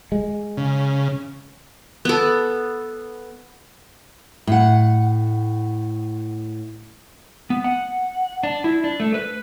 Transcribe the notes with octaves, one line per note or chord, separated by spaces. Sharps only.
G#3
C#3
B3 A4
A2 F#5
B3
F#5
D4
E4
D4
A3
B4